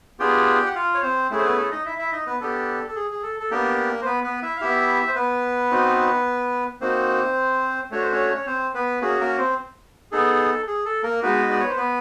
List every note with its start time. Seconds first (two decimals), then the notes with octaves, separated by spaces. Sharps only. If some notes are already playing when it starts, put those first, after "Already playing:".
0.19 B3 D4 F4 G4 G#4 G5
0.66 F#5
0.75 F4 F5
0.94 C#5
1.03 C4 C5
1.31 A3 C#4 E4 G#4
1.38 C5
1.43 B3 B4
1.57 A4
1.71 D#4 D#5
1.86 E4 E5
1.98 E4 E5
2.12 D#4 D#5
2.27 B3 B4
2.40 B3 D4 G4 A4
2.88 A4
2.96 G#4
3.11 G#4
3.22 A4
3.40 A4
3.51 A#3 B3 D4 G4 A#4
4.02 C5
4.06 B3 B4
4.23 B3 B4
4.42 E4 E5
4.56 F5
4.61 B3 E4 G4 E5
5.08 C5
5.15 B3 B4
5.71 C4 D#4 F#4
6.81 A#3 C4 D#4 F#4 C5
7.91 A3 D4 F#4 C#5
8.02 C5
8.12 C#4 C#5
8.37 C#5
8.46 C4 C5
8.74 B3 B4
9.01 A#3 C#4 F#4 G#4
9.20 A#3 A#4
9.38 C4 C5
10.12 B3 D#4 G#4 A4
10.67 G#4
10.86 A4
11.03 A#3 A#4
11.23 G#3 B3 D#4 F#4 B4
11.42 D#5
11.51 D5
11.60 C#5
11.69 C5
11.77 B3 B4